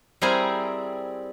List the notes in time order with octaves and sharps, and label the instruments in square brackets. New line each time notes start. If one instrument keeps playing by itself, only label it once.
[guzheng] G3 C4 E4 G#4 A#4 G#5